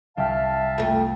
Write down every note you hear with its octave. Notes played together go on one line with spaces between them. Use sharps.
C2 E5 F5 G5 A5 F6
F2 A3